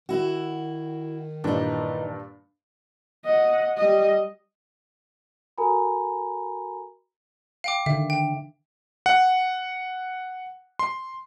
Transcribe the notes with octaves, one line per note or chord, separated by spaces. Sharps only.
D#3 E4 F#4
G2 A#2 E3 D4 D#4
D#5 F#5
G3 D#5
F#4 A4 A#4 G#5 A#5 B5
F5 G5 D6
D3 D#3 E5
G5
F#5
C6